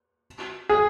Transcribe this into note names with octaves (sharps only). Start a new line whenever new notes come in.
G#4